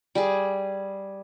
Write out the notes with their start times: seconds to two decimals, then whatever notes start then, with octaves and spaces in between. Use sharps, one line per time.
0.15 G3 G#4